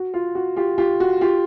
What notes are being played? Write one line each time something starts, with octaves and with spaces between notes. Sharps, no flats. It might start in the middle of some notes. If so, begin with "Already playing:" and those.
Already playing: F#4
F4
F#4
F4 G4
F4 G4
F#4
F4 G4